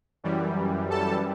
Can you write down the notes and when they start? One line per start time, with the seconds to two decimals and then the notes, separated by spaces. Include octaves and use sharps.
0.24 F#2 E3 G3
0.90 A4 A5